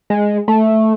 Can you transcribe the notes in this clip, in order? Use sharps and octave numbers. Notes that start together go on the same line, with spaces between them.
G#3
A3